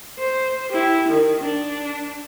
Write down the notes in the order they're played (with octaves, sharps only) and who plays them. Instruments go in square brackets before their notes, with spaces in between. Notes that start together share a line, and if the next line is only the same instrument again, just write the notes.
[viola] C5
E4 G4
D#3
D4